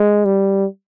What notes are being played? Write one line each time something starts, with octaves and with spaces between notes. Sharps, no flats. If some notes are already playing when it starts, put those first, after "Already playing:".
Already playing: G#3
G3